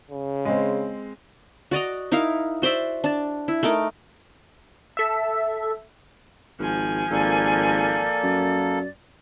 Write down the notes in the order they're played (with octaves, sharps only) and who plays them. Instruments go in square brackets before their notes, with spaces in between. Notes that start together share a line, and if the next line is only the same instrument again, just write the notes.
[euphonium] C#3
[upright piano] G#3 C4
[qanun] F#4 D5 D#5 A#5
D#4 E4 A#4 F5
F#4 C5 D5 E5
D4 A5
E4
A3 D#4 A#4 D6
[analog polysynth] A4 E5
[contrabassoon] G#1 [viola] F3 G#5
[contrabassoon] G#1 [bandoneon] A#3 A4 [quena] D5
[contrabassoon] F#2